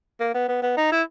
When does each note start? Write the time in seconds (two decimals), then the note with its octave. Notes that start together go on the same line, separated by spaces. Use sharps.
0.20 A#3
0.34 B3
0.49 B3
0.62 B3
0.77 D#4
0.92 E4